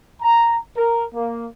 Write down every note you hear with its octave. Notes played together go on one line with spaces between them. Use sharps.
A#5
A#4
A#3